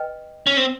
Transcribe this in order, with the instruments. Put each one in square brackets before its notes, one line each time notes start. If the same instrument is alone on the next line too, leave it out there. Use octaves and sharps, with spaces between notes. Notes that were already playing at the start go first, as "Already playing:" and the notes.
Already playing: [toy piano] B4 D#5 G5
[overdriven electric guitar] C#4
C4